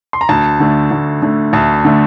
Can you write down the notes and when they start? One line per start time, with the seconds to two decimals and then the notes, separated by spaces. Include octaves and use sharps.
0.13 C6
0.21 A#5
0.29 D2 A5
0.60 D3 A3
0.91 D2
1.22 D3 A3
1.53 D2 A5
1.85 D3 A3